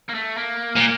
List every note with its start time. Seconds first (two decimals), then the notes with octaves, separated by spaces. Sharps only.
0.09 A#3
0.14 A3
0.37 A#3
0.76 A#2